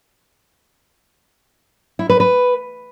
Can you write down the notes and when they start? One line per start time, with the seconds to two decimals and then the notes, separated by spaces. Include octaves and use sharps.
1.99 E4
2.09 B4
2.20 B4